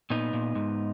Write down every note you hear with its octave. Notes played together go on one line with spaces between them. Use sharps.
A#2 B3 D#4
A#2
G#2